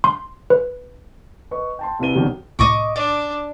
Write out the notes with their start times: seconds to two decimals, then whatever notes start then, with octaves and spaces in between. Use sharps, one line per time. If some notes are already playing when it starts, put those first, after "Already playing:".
0.04 C6
0.50 B4
1.51 B4 D#5 C#6
1.79 G5 A5 C6
1.99 C2 C3 E4 B4 D#7 G7
2.15 B2 D3 D#3 F#3 G3 C4
2.59 C2 A2 D#5 C#6 D6
2.96 D4 D5